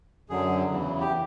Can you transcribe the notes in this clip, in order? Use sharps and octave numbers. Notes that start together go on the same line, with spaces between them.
F#2 D3 F#3 G#4
E2 C#3 E3
G4